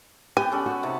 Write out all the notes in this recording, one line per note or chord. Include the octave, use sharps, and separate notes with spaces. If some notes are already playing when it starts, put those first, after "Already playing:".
B3 G4 G5 G#5
C#4 A4 D5
F#4
C3 D#4 A5